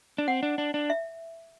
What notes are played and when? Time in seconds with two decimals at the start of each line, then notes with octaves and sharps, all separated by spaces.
0.18 D4
0.28 C4 F#5
0.43 D4
0.58 D4
0.74 D4
0.90 E5